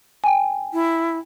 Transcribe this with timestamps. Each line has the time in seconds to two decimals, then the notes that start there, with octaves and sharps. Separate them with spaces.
0.24 G5 G#5
0.73 E4